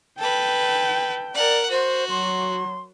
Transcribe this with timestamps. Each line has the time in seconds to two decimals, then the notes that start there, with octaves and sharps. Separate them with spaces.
0.19 A4 B4 G5
1.35 A#4 D5 F#5
1.70 F#4 C5
2.09 F#3 C6